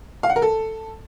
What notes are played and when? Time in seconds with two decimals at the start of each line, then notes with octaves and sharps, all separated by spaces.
0.23 F5
0.30 F#5
0.36 A#4
0.42 A4